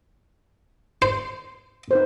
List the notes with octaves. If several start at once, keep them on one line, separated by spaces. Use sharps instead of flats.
C5
D#4 B4 C5